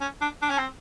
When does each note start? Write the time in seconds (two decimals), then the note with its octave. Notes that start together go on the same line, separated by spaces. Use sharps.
0.01 C#4
0.21 D4
0.42 D4
0.50 C#4
0.58 C4